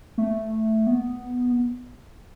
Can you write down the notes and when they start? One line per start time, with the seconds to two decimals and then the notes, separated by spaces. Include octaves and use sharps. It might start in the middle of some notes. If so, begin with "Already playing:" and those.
0.18 A3
0.87 B3